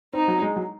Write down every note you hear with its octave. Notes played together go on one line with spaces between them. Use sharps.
C4 D#4
F#3
G#3
F#3